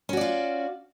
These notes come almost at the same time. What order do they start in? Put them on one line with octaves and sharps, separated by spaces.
C#4 F#4 D5 F4